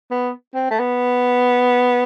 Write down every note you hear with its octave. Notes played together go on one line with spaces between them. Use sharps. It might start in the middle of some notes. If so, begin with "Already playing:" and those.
B3
C4
A3
B3